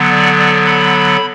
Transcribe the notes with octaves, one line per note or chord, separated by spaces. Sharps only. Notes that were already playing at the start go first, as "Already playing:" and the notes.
Already playing: D3 F#3 B3
D5
D5
B5